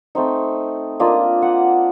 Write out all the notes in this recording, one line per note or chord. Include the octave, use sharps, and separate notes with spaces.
A3 C4 D#4
A#3 D4 F4 D#5
F#5